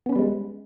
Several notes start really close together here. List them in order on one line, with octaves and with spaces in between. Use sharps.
B3 C#4 B4 G3 G#3